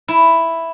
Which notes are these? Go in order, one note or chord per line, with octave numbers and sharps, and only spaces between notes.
E4